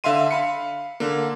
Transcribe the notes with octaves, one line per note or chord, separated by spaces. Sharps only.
D3 E5 F5 C6 D#7
F5 B5 C#7
D3 A#3